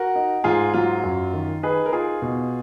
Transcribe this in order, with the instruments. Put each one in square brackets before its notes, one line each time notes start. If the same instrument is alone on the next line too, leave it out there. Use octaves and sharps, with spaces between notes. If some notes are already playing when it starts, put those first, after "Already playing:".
Already playing: [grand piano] F#4 A#4
D#4
G#2 F4 G#4
F#3 F4
F#2
D#3
D#4 G#4 B4
A#4
D#4 F4 G#4
B2